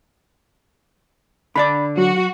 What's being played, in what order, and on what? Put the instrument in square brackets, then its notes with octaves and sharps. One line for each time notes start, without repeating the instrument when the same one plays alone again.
[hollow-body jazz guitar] D3 D4 D5 [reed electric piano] B5
[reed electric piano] F#3 [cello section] F#4